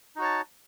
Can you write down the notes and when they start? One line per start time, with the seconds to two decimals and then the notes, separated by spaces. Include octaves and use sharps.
0.16 D#4
0.19 F#4
0.21 C#5
0.24 A5